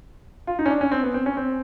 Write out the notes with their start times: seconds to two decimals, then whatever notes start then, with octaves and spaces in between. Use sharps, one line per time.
0.47 F4
0.59 D#4
0.66 C#4
0.70 D4
0.81 C#4
0.92 C4
1.03 B3
1.14 C4
1.26 C#4
1.37 C4